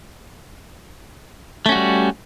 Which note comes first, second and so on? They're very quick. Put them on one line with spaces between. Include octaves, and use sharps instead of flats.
A3 C#4 F#4 G3